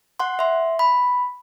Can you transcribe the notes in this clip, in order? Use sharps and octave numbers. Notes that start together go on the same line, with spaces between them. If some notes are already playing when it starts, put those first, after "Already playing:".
F#5 C6
E5 C6
B5